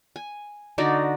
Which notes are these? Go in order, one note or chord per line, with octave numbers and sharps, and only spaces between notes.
G#5
D3 D#4 F#4 D5